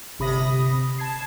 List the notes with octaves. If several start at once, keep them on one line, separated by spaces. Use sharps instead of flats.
G1 C3 B5 D#6 A#6
A5 G#6 C7